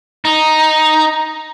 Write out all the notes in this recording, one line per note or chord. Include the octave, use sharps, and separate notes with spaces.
D#4